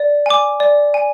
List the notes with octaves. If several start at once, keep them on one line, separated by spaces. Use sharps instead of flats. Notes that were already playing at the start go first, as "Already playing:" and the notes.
Already playing: D5
G#5 D6
D5
G#5